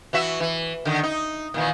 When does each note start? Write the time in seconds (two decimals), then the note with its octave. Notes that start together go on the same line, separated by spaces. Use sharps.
0.13 E3 F#4 E5
0.40 E3
0.85 D3 D#3
1.03 D#4
1.54 A#2 D#3 E3